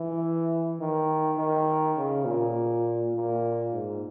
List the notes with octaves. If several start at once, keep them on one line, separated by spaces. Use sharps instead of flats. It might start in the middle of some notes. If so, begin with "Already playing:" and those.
Already playing: E3
D#3
D#3
C#3
A#2
A#2
G#2